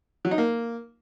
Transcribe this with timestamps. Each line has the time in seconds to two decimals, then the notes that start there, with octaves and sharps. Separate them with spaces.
0.25 F#3
0.31 D#4
0.38 A#3